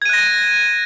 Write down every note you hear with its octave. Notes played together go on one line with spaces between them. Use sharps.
F#6 G#6 A#6 D#7